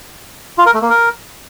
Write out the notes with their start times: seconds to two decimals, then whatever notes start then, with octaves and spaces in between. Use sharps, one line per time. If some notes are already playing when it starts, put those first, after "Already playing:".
0.58 F4
0.66 A#4
0.74 A3
0.82 A#3
0.90 A#4